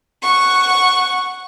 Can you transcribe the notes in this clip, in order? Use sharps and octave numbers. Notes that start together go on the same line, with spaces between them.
F#5 C#6